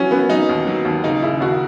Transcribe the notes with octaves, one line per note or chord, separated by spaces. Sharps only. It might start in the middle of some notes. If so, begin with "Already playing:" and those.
Already playing: E3 F#3 C#4
F#3 B3
F#3 D#4
D#2
F#3
D#2
C#3 D#4
C#3 E4
D#2 F#4